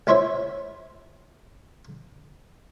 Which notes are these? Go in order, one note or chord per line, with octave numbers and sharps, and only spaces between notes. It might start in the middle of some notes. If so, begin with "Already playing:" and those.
C#2 E4 C5 C#5 E5